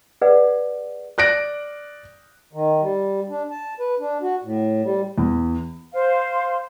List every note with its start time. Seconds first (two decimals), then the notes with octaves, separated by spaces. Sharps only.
0.22 G#4 B4 D5 F#5
1.18 D5 F#6 A#6 D7
2.53 D#3
2.82 G3
3.29 D4
3.51 A5
3.80 B4
4.00 D4
4.22 F#4
4.44 A2
4.84 G3
5.18 E2
5.92 C5 F5